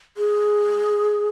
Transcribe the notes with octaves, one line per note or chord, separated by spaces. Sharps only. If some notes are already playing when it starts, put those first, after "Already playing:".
G#4